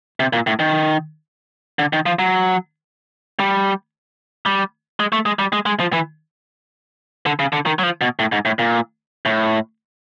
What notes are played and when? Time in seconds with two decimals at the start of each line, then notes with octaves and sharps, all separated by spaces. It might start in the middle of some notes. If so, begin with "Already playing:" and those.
0.20 C3
0.33 A#2
0.47 A2
0.60 D#3
1.79 D3
1.93 D#3
2.06 F3
2.19 F#3
3.40 G3
4.46 G3
5.00 G#3
5.13 A3
5.26 G#3
5.39 G3
5.53 G#3
5.66 G#3
5.80 F3
5.93 E3
7.26 D3
7.40 C#3
7.53 D3
7.66 D#3
7.79 F#3
7.83 F3
8.01 B2
8.19 A2
8.32 G#2
8.45 A2
8.59 A#2
9.25 A2